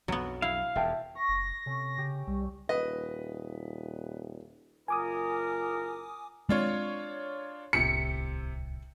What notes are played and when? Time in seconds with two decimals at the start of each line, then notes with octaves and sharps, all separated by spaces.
0.08 B1 F2 F#3 B3
0.42 E4 F5
0.75 E1 F2 E5 G5 A5
1.15 C#6 A#6
1.28 F#1
1.66 C3 A3 C#4
1.98 C#3 G4
2.27 C2 G3 E6
2.69 D#1 B4 D#5
4.88 F#1 F4 A#4 G#5 D6 D#6
6.49 G#3 C4 D4 F4 C#5
7.73 D1 C2 C3 B6 C#7